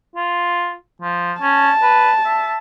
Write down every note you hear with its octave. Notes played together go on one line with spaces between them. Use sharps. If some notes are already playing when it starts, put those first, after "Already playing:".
F4
F3
C#4 A5
B4
E5